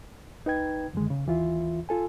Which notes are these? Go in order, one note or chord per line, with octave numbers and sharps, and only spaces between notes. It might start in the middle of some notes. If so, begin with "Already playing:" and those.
C#2 D#4 B4 G5 G#6
F#2 D3 D#3 G#3
C#3
D#2 E3 F4 E5
F4 A4 G#5